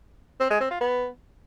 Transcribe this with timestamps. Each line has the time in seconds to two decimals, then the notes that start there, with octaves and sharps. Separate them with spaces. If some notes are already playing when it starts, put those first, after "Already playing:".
0.40 C4
0.50 G#3
0.60 C4
0.71 F4
0.81 B3